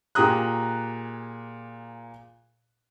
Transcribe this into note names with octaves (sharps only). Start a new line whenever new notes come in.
A#2 G4 G#4 A#5 D#6 F#6